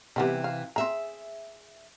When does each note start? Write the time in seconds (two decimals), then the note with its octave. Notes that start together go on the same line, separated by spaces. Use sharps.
0.16 C3 E3 G3 B3 D#4
0.44 F5
0.76 C4 G#4 E5 A#5